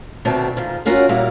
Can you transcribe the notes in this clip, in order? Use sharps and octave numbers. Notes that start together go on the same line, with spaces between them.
D2 B2 D#3 A3 C4 D4
G#2 D#3 F4
F#3 C#4 F4 F#4 A#4 D#5
A#2 F#3 G3 A#3 E4 F5